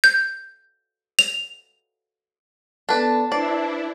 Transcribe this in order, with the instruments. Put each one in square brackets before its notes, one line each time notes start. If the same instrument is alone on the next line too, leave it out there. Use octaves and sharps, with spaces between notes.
[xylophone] G6
F7
[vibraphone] B3 A4 [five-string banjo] D4 B4 [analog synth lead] A5
[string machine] D4 E4 [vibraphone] B4 C5 [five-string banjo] D5